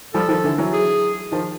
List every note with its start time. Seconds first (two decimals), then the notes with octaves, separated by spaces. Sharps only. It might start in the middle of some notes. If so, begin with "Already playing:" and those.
0.14 F3 G3 A4
0.28 D#3 F3
0.44 D3 E3
0.58 E3 F#3
0.73 G#4
1.32 D#3 F3